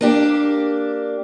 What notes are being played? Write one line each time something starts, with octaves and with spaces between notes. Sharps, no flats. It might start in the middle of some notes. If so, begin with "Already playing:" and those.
A#3 D4 G4